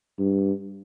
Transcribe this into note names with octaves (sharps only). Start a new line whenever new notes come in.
G2